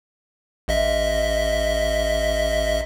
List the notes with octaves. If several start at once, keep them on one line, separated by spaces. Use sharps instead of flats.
A1 D#5 E5